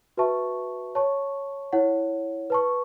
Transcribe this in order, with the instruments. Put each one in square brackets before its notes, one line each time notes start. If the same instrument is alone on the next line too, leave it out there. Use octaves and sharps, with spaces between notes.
[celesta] F#4 B4 E5 A5 C#6
C#5 A5 C#6
E4 C#5 F#5
B4 A5 C#6